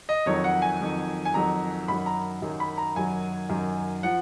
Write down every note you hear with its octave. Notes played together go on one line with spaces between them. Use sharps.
D#5
F2 D#3 F#3 C#5
F#5
G#5
F2 D#3 F#3
G#5
F2 D#3 F#3 A#5
F#2 D#3 F#3 B5
A#5
F#2 D#3 F#3
B5
A#5
F#2 D#3 F#3 G#5
F#2 D#3 F#3
F3 F#5